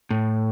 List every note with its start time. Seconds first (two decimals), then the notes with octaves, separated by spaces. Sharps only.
0.11 A2